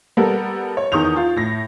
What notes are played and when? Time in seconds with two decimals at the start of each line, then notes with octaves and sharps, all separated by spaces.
0.17 G3 B3 A4 A#4
0.77 C#5
0.92 E2 D#3 C#6 D#6 G6 F7
1.16 F4
1.36 A2 A#6